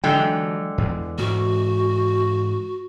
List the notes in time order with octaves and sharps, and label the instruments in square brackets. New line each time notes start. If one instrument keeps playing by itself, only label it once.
[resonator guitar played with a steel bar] D3 G#3 G5 [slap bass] E3 F#3
[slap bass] E2
[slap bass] G#2 E3 [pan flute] F#4